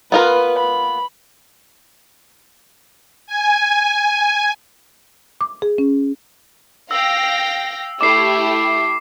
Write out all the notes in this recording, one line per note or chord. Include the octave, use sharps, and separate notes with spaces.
B3 F4 A#4 B4
B5
G#5
D6
G#4
C#4
F5 G5 E6 A#6
A3 E4 G4 D6 C7